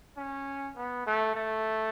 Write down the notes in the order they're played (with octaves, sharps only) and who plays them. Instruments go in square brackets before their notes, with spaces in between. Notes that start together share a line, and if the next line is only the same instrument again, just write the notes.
[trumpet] C#4
B3
A3
A3